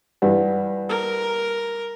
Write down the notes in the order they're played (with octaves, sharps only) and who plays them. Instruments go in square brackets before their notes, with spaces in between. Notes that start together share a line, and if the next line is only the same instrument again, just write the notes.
[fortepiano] G2 E3 [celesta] B4 D5 F#5
[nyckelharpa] A#4